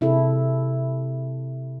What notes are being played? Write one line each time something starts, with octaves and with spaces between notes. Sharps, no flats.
C3 E4 G#4 A4